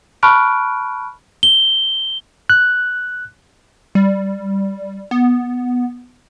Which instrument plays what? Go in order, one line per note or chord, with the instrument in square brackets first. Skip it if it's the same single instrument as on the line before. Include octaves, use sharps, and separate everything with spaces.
[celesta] A5 B5 C#6 F6 F#6 D7
[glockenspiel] G7
[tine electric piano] F#6
[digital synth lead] G3
B3